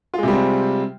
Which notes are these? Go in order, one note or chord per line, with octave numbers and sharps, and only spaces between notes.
C3 G3 G#3 C4 F4